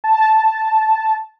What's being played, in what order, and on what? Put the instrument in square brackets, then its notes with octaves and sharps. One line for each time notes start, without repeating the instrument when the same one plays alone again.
[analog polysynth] A5